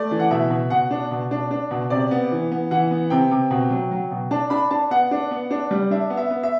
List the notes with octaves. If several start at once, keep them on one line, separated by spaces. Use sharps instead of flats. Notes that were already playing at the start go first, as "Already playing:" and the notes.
Already playing: A3 D5
E3
F#5
B2 E5
B2
B2 F#5
D4
B2
D4
D4
B2
C3 D5
B3
E3
B3
E3 F#5
B3
C3 G5
C3
B2
F#3
F#3
B2
D4 A5
D4 B5
D4 A5
B3 F#5
D4
B3
D4
G3
D4 E5
B3
E5
B3
E5